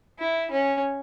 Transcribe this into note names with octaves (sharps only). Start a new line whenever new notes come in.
E4
C#4